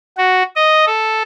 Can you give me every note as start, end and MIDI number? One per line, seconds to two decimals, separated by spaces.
0.17 0.43 66
0.56 0.85 75
0.86 1.23 69